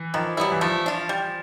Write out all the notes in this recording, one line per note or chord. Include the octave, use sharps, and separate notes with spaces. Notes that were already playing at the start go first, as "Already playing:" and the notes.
Already playing: E3
D#3 F3
F#3 G3 B3 E4
E3
F3 A3
D4 F4
G3